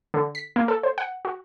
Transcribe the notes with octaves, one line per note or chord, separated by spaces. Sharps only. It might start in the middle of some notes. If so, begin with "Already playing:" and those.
D3
B6
A#3
A4
C5
F#5
F#4